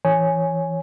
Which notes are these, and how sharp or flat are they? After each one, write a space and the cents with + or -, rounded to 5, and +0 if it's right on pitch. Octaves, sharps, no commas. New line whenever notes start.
E3 +5 C#5 +0 G#5 +0